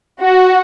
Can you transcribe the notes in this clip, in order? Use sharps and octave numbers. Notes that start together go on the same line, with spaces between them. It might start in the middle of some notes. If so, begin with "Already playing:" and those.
F#4